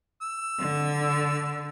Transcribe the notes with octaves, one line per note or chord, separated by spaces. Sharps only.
E6
D3